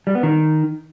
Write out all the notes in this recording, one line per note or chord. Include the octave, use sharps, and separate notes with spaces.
G3
B3
D#3